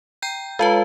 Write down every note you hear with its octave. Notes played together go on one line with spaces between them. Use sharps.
G5 A#5 G6
G#3 F4 A4 B4 F5 A5